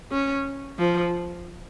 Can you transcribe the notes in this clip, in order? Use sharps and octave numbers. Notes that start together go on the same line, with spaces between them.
C#4
F3